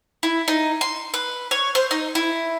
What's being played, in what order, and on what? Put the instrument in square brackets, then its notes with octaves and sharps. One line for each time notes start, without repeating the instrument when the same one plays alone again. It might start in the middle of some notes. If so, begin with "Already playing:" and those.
[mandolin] E4
D#4
C6
B4
C#5
C5
D#4
E4